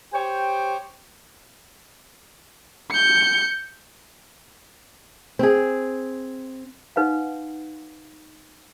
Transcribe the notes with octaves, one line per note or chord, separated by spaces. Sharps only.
G4 C5 C#5 G5
G6 C#7
C4 G#4
D#4 B4 F5 F#5